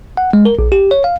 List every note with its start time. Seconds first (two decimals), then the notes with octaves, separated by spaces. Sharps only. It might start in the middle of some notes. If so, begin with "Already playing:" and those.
0.17 F#5
0.33 G#3
0.45 A#4
0.59 A#1
0.72 G4
0.91 C#5
1.04 F5